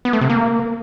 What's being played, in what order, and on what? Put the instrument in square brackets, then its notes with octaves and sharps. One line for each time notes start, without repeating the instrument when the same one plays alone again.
[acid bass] B3
A3
C3
A#3